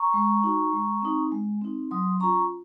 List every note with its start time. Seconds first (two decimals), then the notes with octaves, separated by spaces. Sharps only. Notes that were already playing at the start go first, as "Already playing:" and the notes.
Already playing: A#5 C#6
0.14 G#3
0.44 D#4 F#4
0.73 G#3
1.02 C4 D#4
1.32 G#3
1.61 C4 D#4
1.91 F#3 C6 D#6
2.20 C#4 F4 A#5 C#6